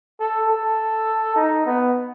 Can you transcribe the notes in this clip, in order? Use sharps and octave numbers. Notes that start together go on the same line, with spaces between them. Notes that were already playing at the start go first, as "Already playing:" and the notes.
A4
A4
D#4
B3